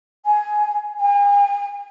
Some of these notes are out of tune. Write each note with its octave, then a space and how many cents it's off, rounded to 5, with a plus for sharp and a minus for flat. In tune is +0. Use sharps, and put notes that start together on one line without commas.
G#5 +15
G#5 -40